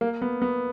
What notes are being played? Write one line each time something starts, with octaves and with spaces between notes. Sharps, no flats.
A#3
B3
B3